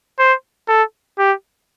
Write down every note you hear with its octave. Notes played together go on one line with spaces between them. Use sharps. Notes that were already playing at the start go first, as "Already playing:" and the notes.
C5
A4
G4